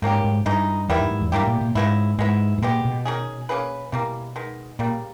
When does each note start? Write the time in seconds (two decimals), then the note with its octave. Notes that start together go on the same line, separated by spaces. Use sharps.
0.02 G#2 D#3 A#3 C#4 G4
0.24 G#2
0.45 G2 E3 G#3 D#4
0.88 E2 D#3 G3 B3 E4
1.00 G2
1.11 G#2
1.21 E2
1.32 G2 G3 A#3 E4 G4
1.47 A#2
1.61 A#2
1.75 G#2 C#3 G#3 B3 E4
2.18 G#2 G#3 B3 E4
2.58 G#2
2.62 A#2 G#3 B3 G4
2.85 B2
3.05 D#3 G3 C#4 G#4
3.49 A#3 C#4 G#4 B4
3.92 B2 E3 G3 A#3
4.36 D#3 G#3 B3
4.79 A#2 C#3 G3 A#3